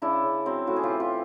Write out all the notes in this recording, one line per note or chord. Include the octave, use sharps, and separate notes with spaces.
C#3 D4 E4
C#3
F#3 C4
A2 E4 F#4
G#4
F4 G4
E3
F4 G4